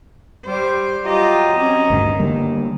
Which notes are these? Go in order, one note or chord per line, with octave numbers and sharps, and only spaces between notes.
G3 C5
F#3 F4 G4 D#5 A#5
C4 C#4
D2 G2 D#3
D3 G3 A#3